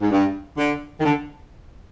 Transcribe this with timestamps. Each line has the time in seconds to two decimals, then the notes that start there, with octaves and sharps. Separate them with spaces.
0.02 G#2
0.11 G2
0.58 D3
0.99 D#3
1.05 D3